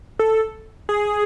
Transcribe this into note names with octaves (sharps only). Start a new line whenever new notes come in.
A4
G#4